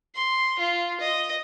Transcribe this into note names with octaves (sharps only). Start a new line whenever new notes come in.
C6
F4
D#5